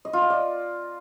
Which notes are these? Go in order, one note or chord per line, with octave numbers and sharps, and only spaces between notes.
D#5
F4
D#5
D5